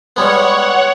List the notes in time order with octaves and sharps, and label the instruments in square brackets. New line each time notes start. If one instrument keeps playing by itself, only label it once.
[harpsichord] G3 G#3 B3 [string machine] C#5 F#5